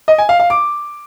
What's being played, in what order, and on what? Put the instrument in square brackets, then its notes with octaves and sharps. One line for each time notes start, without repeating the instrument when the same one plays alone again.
[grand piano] D#5
G#5
F5
F5
D6